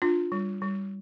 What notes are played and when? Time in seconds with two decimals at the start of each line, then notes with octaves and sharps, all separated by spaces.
0.02 D4 F4
0.32 G3
0.62 G3